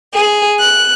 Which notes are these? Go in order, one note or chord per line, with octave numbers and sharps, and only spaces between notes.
G#4
F#6